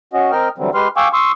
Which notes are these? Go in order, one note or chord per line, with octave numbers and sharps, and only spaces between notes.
C#4 F#4 D#5
C4 A#4 D#5 G5 F6
D3 E3 F#3 G3 C4
G#3 G4 B4 C6 F6
F5 G5 G#5 C#6 D6 E6
C6 C#6 D#6 E6